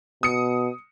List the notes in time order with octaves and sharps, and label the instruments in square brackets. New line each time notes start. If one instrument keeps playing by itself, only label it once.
[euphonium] B2 [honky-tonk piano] D#6 C#7